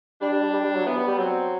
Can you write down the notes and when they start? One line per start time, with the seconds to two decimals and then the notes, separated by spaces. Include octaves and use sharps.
0.21 G3 D4
0.33 G3
0.43 G3
0.54 G3
0.64 G3
0.75 F#3
0.87 E3 B3
0.96 G3
1.08 G3
1.18 F#3 C4